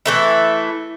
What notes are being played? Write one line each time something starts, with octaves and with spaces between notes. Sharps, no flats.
E3 A3 E4